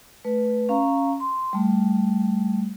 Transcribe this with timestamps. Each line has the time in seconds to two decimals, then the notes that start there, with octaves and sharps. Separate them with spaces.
0.25 A3 B4
0.69 C#4 F5 A#5 C#6
1.20 C6
1.53 G3 A3